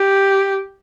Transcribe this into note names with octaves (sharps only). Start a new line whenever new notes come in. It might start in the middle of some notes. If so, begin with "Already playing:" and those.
Already playing: G4